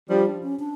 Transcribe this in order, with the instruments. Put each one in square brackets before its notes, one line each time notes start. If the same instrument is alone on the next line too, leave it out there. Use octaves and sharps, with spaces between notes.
[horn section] F3 G3 [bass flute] D4
[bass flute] D4
C#4
D4